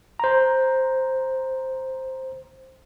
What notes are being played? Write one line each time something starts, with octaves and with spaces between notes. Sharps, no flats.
C5 A#5